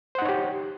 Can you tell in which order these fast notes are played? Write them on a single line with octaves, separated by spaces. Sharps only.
C5 F#5 D#4 C#5 G4